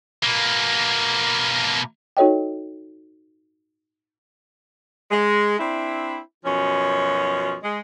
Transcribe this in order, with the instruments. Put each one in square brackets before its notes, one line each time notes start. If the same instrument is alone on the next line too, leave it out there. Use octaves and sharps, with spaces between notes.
[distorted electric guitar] B2 A#3
[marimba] D#4 F#4 A4 C#5 D#5 G5
[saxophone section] G#3
C4 D4 E4
F#2 B2 F3 C#4
G#3